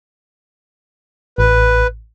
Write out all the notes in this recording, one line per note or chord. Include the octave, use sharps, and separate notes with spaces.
A1 B4